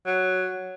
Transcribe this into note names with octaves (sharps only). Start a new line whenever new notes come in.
F#3